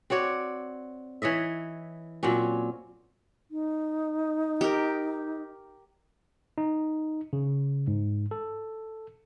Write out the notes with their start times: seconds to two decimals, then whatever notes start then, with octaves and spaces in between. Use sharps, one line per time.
0.10 C4 F#4 C#5 D5
1.22 E3 C#5 D#5 E5
2.23 A#2 F#3 C4 C#4
3.51 D#4
4.61 G4 A#4
6.58 D#4
7.33 C#3
7.87 G#2
8.31 A4